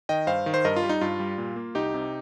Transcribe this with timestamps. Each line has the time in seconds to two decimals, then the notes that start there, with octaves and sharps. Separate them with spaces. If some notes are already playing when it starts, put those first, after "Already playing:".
0.09 D#3 D#5 G5
0.27 G2 C5 F5
0.46 D#3
0.54 C5
0.65 G2 A#4 D#5
0.76 F4
0.83 G3
0.89 D#4
1.01 G2 F4
1.20 G3
1.38 A#2
1.56 A#3
1.75 C2 D#4 G4
1.94 C3